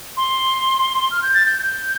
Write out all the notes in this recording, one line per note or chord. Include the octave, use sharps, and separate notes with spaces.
C6
F6
G6
A6
G6
G6